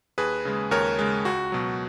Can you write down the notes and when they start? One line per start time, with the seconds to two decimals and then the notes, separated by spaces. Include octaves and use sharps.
0.18 D#2 G#4 B4
0.45 C#3 G#3
0.71 D#2 A#4 C#5
0.99 C#3 G#3
1.25 C#2 F#4
1.52 B2 F#3